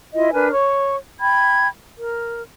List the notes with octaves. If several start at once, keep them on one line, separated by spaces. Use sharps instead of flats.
E4 F4 D#5
D4 A#4 B4 G#5
C#5 C#6
G5 B5 G#6
A#4